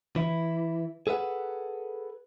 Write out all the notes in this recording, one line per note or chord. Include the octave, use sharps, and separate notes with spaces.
E3 E4
G#4 A4 B4 E5 F#5